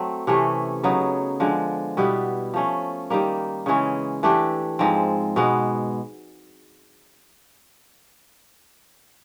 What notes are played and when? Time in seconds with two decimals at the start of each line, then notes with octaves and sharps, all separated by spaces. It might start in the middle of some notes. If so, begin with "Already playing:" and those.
Already playing: F#3 A3 C4
0.27 C3 E3 A3 C#4
0.83 C#3 F#3 B3 D#4
1.40 D3 F3 G#3
1.97 B2 G3 B3 E4
2.54 F3 A3 C#4
3.10 D#3 G3 A#3
3.66 C#3 E3 G#3 C#4
4.23 E3 A3 D4 G4
4.79 G#2 F3 G#3 C4
5.36 B2 G#3 B3